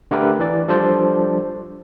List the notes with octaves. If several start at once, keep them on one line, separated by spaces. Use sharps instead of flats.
D3 A3 G4 A#4 B4
E3 D5
F3 G3 D4 A4 C5 D5